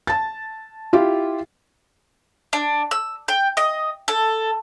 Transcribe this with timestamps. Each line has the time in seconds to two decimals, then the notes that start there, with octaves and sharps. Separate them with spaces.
0.07 A5 A6
0.93 E4 F4 G4
2.53 D4
2.91 E6
3.28 G5
3.57 D#5
4.08 A4